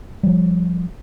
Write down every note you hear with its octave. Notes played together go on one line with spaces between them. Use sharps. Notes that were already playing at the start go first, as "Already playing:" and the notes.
F3 G3